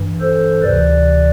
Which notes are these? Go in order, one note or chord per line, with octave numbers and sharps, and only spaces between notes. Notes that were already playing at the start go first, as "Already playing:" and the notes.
Already playing: G2 E3
A4 C5
D2 C3 E3 B4 D5